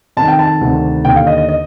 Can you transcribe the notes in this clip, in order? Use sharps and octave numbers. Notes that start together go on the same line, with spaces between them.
F2 D#3 A5
G5
A5
D2 C3 D#3
D#2 D3 G5
F5
D#5
D#5
D#5